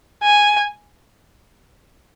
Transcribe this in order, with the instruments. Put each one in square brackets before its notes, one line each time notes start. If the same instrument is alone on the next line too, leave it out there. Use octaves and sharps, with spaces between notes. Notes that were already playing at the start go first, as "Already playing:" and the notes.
[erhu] G#5